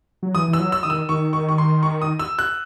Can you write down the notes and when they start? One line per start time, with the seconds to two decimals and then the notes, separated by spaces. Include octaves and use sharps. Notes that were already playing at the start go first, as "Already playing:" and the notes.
0.23 F#3
0.35 E3 D#6
0.48 E3
0.53 E6
0.60 F#3
0.72 E6
0.83 D#3 D#6
0.90 E6
1.09 D#3 C#6
1.33 C#6
1.49 C#6
1.58 C6
1.83 C#6
2.02 D#6
2.19 E6
2.39 F#6